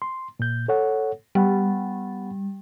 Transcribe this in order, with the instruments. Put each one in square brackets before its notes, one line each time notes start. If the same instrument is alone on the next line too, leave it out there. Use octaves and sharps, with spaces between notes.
[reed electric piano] C6
A#2 G6
A4 C#5 F#5
[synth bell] G3 [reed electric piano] B3 F#5 B5